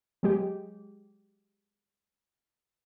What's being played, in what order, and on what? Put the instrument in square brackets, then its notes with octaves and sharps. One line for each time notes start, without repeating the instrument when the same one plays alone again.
[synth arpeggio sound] F#3 G#3 G4